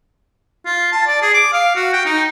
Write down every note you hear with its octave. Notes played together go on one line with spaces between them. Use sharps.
F4
A5
D5
G#4
D6
F5
F#4
G5
D#4